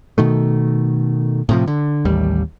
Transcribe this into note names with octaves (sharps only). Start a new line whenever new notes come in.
B2 D#3 A3
A2 C3 F3
D3
A1 D#2 G3